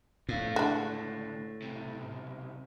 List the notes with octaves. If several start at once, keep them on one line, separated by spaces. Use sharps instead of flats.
F2 A2 F5
C#2 D3 D4 F#4
B1 C3